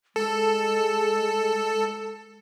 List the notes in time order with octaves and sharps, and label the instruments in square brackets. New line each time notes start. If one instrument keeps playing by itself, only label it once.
[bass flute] G#3 [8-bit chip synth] A4